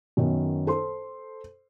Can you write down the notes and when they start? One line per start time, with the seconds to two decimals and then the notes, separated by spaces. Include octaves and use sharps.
0.17 F#2 D#3 B3 C#4 D#4
0.67 A4 C5 C6